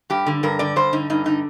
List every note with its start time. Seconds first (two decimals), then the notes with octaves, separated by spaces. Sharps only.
0.10 G2 G4
0.26 D3
0.43 G2 A#4
0.59 D3 D5
0.76 G2 C5
0.93 D3 D#4
1.10 G2 D#4
1.25 D3 D#4